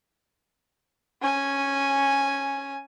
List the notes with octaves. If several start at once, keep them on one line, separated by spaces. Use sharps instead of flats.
C#4 G#5